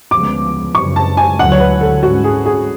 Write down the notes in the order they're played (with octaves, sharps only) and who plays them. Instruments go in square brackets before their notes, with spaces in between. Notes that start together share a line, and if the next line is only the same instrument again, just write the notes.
[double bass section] D2 C#3 F3 G#3 B3 [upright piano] D6
[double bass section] F#2 C#3 F#3 [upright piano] C#6
[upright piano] A5
G#5
[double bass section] D2 D3 F#3 [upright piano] F#5
[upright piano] C#5
B4
A4
[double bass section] G#2 G#3 C#4 [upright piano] F#4
[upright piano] G#4
G#4